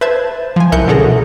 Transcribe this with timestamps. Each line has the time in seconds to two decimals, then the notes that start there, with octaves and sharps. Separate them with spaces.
0.01 B4 C5 E5 A5 G#6
0.56 F3 G#5
0.72 C2 E4 A#4 C#6 F#6 G6
0.87 B2 D3 C#4 G#4 A4 A#5
1.04 B2